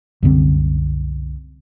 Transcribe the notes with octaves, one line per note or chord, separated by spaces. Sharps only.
C2 F#2 D3 C4